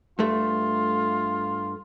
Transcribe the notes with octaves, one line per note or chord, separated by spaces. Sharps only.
G2 A3 F4